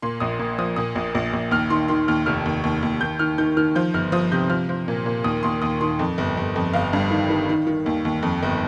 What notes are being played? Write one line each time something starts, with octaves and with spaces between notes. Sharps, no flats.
A#2 C6
A#1 D#6
A#2
F3 D#6
A#2 D#6
A#1
A#1
A#1
D#2 F6
D#3 C6
D#3 C6
D#2 F6
F1 F6
D#2
D#2
D#2
D#2 G6
D#3 F6
D#3 G6
D#3 F6
F3 G6
G1 F6
F3 D#6
C3 G6
F3 F6
F3
A#2
A#2
D#2 D#6
D#2 C6
D#2 D#6
D#3 C6
F2
G1
G1
F2
G1 F5
G2
D#3
D#3
D#3
D#3
D#2
D#2
F2
G1